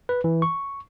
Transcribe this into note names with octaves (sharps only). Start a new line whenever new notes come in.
B4
E3
C#6